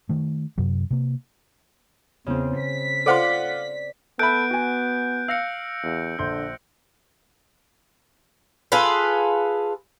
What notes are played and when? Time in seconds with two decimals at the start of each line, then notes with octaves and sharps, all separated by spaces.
0.09 D#3 A3
0.58 F#2 C3 F#3
0.91 C3 A#3
2.26 E2 C#3 C4
2.59 B6
3.06 F4 A4 C5 D5 F#5 C6 D6
4.19 B3 A4 E5 B5 F#6 G6 D7
4.51 F#4 G#5
5.28 F5 E6 A#6 C#7
5.83 E2
6.19 A#1 D3 C6 G6
8.72 F4 G#4 A4 B4